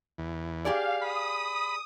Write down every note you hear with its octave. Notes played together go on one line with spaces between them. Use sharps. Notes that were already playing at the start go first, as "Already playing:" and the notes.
E2
G4 G#4 D5 F5
B5 D#6